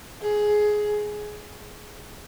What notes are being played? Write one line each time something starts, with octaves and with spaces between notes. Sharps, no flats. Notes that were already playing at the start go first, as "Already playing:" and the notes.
G#4